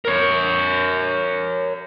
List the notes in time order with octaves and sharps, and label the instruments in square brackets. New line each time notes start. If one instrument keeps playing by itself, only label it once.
[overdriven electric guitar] A#4 C#5